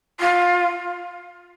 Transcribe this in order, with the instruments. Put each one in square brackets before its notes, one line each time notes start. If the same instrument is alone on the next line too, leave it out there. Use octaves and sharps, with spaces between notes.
[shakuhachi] F4